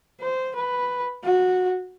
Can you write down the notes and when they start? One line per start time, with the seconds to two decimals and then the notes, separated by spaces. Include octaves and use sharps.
0.21 C5
0.56 B4
1.23 F#4